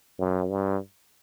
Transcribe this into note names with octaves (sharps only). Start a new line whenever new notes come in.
F#2
G2